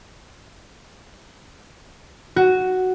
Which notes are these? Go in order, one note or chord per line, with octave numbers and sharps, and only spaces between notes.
F#4